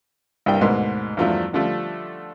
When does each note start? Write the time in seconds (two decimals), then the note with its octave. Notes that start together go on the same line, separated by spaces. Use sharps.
0.46 C2 G2 A#3 D5 G5
0.61 D2 G#2 B2 A#4 C6
1.17 E2 G2 F3 F#3 A3 D4
1.53 D3 F3 G3 A3